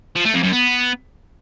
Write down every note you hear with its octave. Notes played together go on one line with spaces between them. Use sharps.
F3
A3
F2
F#2
B3